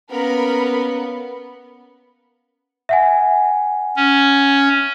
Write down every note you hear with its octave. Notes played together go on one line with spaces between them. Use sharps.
A#3 B3 C#4 A#4 B5
E5 F#5 G#5
C#4